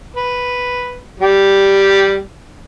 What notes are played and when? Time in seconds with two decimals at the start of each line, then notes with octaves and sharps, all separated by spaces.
0.16 B4
1.20 G3 G4